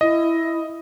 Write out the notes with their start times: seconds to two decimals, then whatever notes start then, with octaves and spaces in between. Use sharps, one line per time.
0.01 E4 D#5